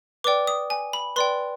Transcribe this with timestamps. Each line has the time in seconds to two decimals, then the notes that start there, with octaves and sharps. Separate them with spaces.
0.24 B4 D5 G5 D6
0.47 D#6
0.70 G#5
0.93 B5
1.16 B4 D5 G5 C6